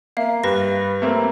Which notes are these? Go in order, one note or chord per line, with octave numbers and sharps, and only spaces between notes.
A#3 E5 F5
G2 G4 B4 A#6
A3 A#3 C4